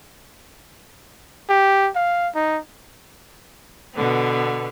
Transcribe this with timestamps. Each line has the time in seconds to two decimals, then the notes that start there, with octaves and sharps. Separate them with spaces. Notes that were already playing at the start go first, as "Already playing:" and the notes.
1.49 G4
1.95 F5
2.35 D#4
3.94 B2 D3 B3